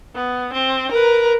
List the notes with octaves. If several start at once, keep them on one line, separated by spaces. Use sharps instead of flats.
B3
C4
A#4 B4